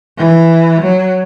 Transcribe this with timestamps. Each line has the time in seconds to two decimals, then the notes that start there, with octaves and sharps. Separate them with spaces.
0.17 E3
0.82 F#3